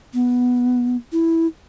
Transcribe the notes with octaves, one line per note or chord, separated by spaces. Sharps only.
B3
E4